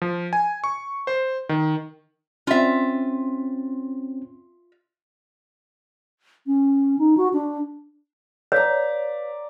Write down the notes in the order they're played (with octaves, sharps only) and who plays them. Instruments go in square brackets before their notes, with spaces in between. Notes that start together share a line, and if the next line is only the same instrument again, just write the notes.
[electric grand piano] F3
G#5
C#6
C5
D#3
[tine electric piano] C4 C#4 [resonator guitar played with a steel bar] F4 E5
[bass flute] C#4
D#4
F#4
D4
[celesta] B4 F5 B6 [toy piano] C#5 [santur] D5 A#5